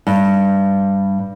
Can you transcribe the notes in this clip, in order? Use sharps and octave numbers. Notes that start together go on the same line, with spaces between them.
G2